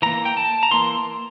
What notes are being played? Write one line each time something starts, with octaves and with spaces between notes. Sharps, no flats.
E3 A#3 A#5
G5
A5
A#5
E3 A#3 C6